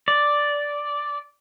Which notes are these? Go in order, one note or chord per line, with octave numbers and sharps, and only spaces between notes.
D5